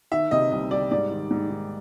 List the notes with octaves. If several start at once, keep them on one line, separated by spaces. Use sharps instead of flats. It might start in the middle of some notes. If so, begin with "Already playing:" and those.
D#3 E5
C3 D#5
C2 D#5
G3 D5
G#2 D5
D#3
G#2
D#3